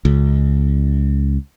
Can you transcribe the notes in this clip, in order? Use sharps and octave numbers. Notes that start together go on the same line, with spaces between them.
C#2